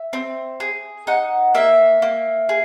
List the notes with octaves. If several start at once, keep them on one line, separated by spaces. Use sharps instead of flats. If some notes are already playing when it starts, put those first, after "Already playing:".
Already playing: E5
C4
G#4
D#4 F#5
A#3 E5
A#3
G#4